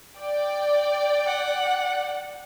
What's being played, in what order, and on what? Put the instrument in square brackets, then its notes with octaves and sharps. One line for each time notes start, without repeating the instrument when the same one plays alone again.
[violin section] D5 G5
[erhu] F#5